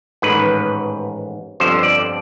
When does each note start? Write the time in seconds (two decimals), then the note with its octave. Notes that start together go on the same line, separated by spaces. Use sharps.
0.22 A1 G#2 D#3 B4
1.60 G1 F2 D3 F3 C5
1.83 D5